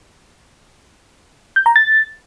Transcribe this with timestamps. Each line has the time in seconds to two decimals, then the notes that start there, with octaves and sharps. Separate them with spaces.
1.56 G6
1.66 A#5
1.76 A6